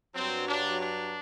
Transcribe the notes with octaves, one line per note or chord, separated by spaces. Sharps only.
G2 F#3 C4
D4
D4